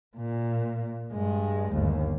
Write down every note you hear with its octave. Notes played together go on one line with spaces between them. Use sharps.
A#2
G2 G#3
G1 D#2